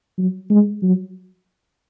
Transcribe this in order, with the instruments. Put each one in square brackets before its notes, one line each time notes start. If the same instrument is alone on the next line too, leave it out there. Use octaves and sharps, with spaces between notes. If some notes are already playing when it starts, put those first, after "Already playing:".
[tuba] F#3
G#3
F#3